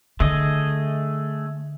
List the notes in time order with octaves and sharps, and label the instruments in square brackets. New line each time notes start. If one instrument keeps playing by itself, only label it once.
[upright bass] D3 [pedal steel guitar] A3 G#4 D#5